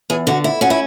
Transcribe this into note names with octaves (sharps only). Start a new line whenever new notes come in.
E2 G#4
D3 F#4
E4
C#4 F#4
E4